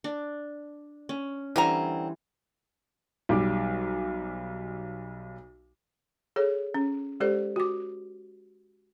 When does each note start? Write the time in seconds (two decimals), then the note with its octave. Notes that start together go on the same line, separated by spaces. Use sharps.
0.04 D4
1.09 C#4
1.56 D3 E3 G3 C4 G#5 A#5
3.29 B1 G3 D6
6.36 G#4 A4 C#5
6.75 C#4
7.20 G#3 G4 A4 C5 D5
7.56 F#4 D6